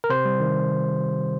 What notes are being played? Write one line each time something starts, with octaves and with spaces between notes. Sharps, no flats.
A#4
C3 C5
G3
D#3